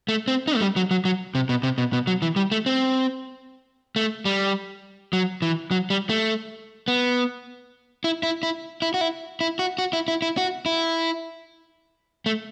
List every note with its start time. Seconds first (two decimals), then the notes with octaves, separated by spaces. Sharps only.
0.08 A3
0.28 C4
0.48 D#4
0.56 A3
0.61 G3
0.76 F#3
0.91 F#3
1.05 F#3
1.35 C3
1.49 B2
1.63 C3
1.78 B2
1.93 B2
2.07 F#3
2.22 E3
2.36 G3
2.52 A3
2.66 C4
3.96 A3
4.25 G3
5.13 F#3
5.42 E3
5.71 F#3
5.90 G3
6.09 A3
6.88 B3
8.04 E4
8.23 E4
8.43 E4
8.82 E4
8.94 F#4
9.01 E4
9.41 E4
9.59 F#4
9.78 F#4
9.93 E4
10.08 E4
10.22 E4
10.37 F#4
10.66 E4
12.26 A3